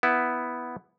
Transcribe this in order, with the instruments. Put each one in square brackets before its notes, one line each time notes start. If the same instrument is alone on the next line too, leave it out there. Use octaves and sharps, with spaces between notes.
[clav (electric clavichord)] B3 E4